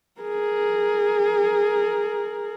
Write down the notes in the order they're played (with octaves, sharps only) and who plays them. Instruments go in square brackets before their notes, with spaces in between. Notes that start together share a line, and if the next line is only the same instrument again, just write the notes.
[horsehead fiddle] G#4 A#4